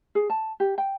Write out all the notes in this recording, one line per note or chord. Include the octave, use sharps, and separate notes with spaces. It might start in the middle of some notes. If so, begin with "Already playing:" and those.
G#4
A5
G4
G5